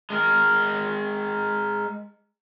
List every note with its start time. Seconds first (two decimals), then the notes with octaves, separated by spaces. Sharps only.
0.10 G#3 A#4